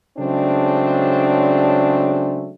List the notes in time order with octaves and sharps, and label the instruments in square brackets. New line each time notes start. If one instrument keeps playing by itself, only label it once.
[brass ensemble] C#3 F#3 G#3 A3 C4 D4